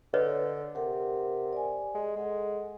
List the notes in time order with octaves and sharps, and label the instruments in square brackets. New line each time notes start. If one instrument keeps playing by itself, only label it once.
[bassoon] D3 [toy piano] B4 C#5 D#5
[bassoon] C3 [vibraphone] G4 A#4 F#5
[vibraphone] D5 G#5
[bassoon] G#3
[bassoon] G#3 [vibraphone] A4 F#5